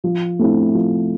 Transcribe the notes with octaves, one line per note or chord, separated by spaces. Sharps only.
F3
A3 C4 E4
F3